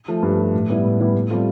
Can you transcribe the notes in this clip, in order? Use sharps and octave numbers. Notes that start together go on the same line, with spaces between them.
F3 A3
G2
F3 A3
A2
G3 B3 E4
A2
G3 B3 E4
A2
G3 C4 F4 A4